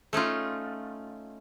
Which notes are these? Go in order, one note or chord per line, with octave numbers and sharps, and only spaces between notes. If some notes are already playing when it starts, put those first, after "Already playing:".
A3 C#4 D#4 F4